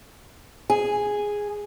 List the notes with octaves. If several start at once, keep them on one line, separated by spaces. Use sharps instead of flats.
G#4